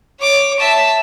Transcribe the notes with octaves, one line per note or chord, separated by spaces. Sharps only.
C#5 D6
E5 A5